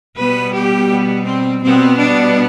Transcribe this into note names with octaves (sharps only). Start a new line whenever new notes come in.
B2 G3 B3 B4
G4
B3
C4
B2 G3 B3 C4
D4